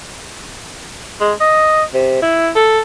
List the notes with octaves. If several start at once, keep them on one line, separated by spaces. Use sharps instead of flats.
G#3
D#5
C3
E4
A4